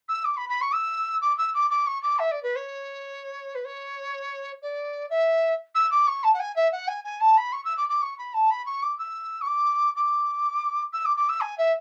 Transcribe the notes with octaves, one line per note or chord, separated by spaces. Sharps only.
E6
D6
B5
B5
C#6
E6
D6
E6
D6
D6
C#6
D6
E5
D5
B4
C#5
B4
C#5
D5
E5
E6
D6
C#6
A5
F#5
G#5
E5
F#5
G#5
G#5
A5
B5
C#6
E6
D6
D6
C#6
B5
A5
B5
C#6
D6
E6
C#6
D6
D6
E6
D6
D6
E6
G#5
E5